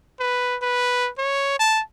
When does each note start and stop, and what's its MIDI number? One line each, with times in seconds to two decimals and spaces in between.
0.20 0.57 71
0.62 1.09 71
1.18 1.58 73
1.59 1.81 81